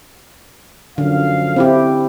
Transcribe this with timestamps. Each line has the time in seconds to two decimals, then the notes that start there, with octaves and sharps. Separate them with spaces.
0.98 F#2 D3 F3 F5
1.56 C4 E4 G4